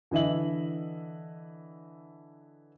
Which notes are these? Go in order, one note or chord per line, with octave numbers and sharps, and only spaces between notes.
D3 E3 D#5 E5 F#7